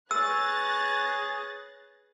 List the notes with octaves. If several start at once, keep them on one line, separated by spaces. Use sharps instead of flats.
G#4 B4 C#5 E6 F#6 A6 A#6